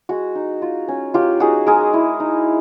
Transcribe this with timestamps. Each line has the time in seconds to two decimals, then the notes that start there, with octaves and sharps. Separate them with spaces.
0.09 G#3 F#4
0.35 D#4
0.62 F4
0.88 C#4
1.14 F#3 F4 G4
1.40 D#4 F#4 G#4
1.67 G#3 G#4 A#4
1.93 E4
2.20 D#4